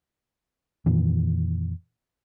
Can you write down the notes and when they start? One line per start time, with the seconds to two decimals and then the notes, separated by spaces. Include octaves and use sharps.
0.86 F2 A#2 D#3 E3